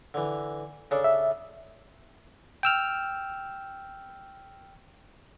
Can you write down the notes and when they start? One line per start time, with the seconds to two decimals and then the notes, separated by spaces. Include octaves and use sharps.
0.14 D3 E3
0.91 C#3 D4 A4
1.04 E5
2.63 G5 E6 F6